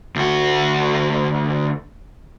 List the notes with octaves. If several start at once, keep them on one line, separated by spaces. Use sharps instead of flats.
D2 F#4